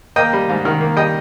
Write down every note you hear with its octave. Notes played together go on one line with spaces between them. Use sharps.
A#3 D#5 G5
G3
G#2
D#3
A#3
G3 D#5 G5